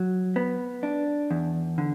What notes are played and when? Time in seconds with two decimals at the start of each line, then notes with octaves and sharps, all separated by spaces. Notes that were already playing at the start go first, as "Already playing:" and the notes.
Already playing: F#3
0.36 B3
0.83 D4
1.31 E2
1.78 D3